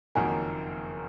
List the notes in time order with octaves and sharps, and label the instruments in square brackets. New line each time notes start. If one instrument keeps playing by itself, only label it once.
[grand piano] F#1 F2 D#3 F#3 A#3 [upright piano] G#5